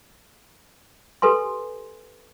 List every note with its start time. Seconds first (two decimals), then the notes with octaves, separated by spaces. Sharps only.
1.22 G4 A4 B4 G#5 C6